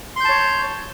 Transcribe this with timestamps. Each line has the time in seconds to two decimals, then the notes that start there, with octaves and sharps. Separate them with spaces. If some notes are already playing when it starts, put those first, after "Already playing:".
0.16 C6
0.20 G6
0.25 A5
0.29 C#5